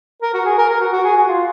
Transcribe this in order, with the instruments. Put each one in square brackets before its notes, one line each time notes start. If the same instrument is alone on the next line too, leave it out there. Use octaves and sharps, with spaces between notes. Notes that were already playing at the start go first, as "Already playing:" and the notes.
[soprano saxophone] A#4
F#4
G#4
A#4
A#4
F#4
F#4
G#4
F#4
F4